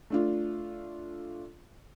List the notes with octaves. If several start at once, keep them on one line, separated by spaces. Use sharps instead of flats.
A3 D4 F4